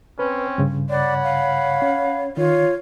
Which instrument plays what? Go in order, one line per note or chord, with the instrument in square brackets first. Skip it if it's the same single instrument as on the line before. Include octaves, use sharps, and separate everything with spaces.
[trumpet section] C4 C#4 [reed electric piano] B4
[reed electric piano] G2 C#3
[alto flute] C#5 [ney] D5 [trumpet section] F#5 B5
[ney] F5
[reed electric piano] C#4
[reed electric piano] D#3 [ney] F4 [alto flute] C#5